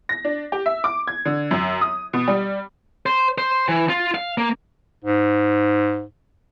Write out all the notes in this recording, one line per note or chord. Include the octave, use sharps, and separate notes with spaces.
A#6
D4
G4
E5
D6
G#6
D3
F#2
D#6
B2
G3
C5
C5
E3
F4
F5
A#3
G#2